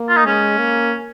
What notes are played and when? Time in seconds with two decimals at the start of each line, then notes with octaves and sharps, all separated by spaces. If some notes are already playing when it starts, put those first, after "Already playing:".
Already playing: A#3
0.09 F4
0.16 D#4
0.26 G#3 C#4
0.58 A#3